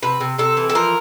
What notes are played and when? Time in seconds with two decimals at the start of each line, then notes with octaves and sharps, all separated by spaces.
0.02 C3 B4
0.20 C3
0.38 C3 A4
0.57 E3
0.70 A4
0.75 F3 A#4